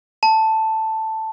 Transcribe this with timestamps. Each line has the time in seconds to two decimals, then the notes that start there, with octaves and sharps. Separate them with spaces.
0.23 A5